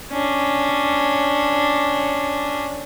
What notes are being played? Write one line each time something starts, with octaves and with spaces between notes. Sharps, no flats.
C#4 D4